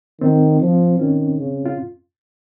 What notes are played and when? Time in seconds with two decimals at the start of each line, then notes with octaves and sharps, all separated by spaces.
0.21 D#3 C4
0.61 F3
0.99 D#3 C#4
1.38 C#3
1.66 F4